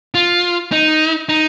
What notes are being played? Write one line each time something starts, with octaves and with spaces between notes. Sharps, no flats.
F4
D#4
D#4